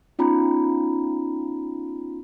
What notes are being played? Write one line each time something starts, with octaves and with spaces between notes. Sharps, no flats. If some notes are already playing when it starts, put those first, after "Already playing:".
B3 C#4 D#4 F4 A#5 B5